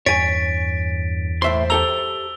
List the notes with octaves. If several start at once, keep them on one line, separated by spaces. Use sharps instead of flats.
E2 G2 C#5 G#5 A6 B6 D7
A2 C5 E5 C6
G4 A4 A#5 E6 F7 G7